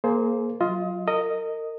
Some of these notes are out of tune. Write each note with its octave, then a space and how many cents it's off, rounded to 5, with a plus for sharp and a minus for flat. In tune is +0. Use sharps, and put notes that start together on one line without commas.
A#3 +0 G#4 +35 C5 +0
F#3 +0 F4 +0 D#5 +30
A#4 -35 D#5 +0